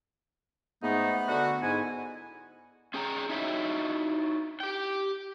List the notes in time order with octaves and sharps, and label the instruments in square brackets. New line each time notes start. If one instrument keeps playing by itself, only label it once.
[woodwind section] G#2 A3 D#4 [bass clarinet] B3
[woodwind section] D3 F#4
G#2 E4 G#5
[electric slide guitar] C#4 G#4 G5 A5 A#5
D#4 E4 F#4 C#5 E5
G4 G5